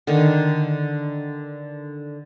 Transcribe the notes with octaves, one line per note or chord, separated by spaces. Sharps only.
D3 D#3